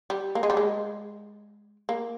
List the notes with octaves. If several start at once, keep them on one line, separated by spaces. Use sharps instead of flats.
G3
A#3
G#3
G3
G#3
A#3